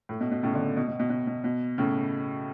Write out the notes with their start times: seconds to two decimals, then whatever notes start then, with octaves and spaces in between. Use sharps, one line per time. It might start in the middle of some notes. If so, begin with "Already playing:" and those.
0.09 A2
0.21 B2
0.32 B2
0.43 A2 C#3
0.54 B2 D3
0.77 B2
0.88 B2
0.99 B2
1.10 B2
1.27 B2
1.44 B2
1.78 A2 C#3